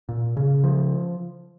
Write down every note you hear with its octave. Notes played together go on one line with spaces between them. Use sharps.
A#2
C#3
F3